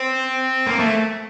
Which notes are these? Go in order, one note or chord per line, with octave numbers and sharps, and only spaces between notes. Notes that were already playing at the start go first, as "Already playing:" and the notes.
Already playing: C4
A#3
A3